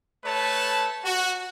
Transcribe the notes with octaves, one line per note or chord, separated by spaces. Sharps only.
A3 B4 C#5 A5
F#4